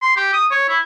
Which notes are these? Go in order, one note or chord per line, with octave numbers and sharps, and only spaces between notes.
C6
G4
D#6
C#5
E4